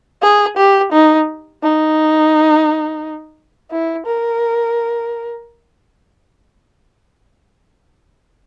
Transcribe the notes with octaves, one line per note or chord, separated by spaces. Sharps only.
G#4
G4
D#4
D#4
E4
A#4